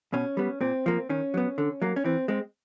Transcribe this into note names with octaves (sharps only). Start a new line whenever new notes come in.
B2 C#4
G3 B3
A#2 C4
F3 A#3
D#3 C#4
F#3 B3
D3
F#3 A#3
C#4
E3 C4
G#3 C4